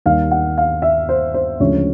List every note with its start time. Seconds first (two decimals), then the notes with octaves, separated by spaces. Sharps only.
0.06 D#2 D#3 G3 F5
0.31 F#5
0.58 F5
0.82 E5
1.09 C5
1.34 C5
1.60 D2 C#3 F3 G#3 C#5